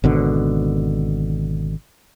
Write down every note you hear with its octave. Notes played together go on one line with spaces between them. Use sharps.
G#1 B2 D3